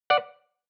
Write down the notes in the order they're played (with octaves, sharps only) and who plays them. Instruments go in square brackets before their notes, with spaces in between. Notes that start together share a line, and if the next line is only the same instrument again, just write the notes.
[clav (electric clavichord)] D5 F#5